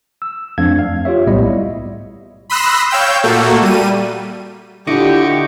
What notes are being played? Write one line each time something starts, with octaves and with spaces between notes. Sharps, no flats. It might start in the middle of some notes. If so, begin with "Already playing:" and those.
E6
F2 F3 A3 D4 F5 G#6
F5
F4 G4 C#5 E5
B1 A2 G3 B3 E4 D#5
B5 C6 D#6 E6 F#6 A#6
C#5 F5 G5 E6 G6
A#2 A3 A#3 F#4 A4
G3 D#7
D3 E4 F4 G4 D#5 C#6 D6